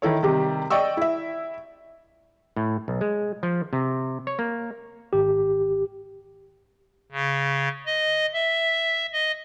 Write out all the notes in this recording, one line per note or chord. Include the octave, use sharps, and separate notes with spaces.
D#3 E4 A4 C#5
C3 D#3 G3 G4
D5 D#5 G5 C#6 E6
E4 E5
A2
B1
G#3
F3
C3
C#5
A#3
G#1 G4
C#3
D#5
E5
D#5